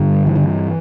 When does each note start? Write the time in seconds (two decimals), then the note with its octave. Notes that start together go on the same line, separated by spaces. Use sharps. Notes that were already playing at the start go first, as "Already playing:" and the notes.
Already playing: G2 D3 G3
0.27 E3
0.35 D3
0.44 E3